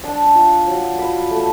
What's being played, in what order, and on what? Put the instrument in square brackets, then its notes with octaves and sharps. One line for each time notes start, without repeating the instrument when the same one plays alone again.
[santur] D4 A5
F4
F#3
F4 B5
A3